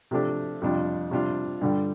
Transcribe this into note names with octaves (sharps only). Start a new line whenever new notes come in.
C3 F3 A3 D4 G4
F2 C3 G3 D4 F4
C3 G3 D4 F4
G2 D3 G3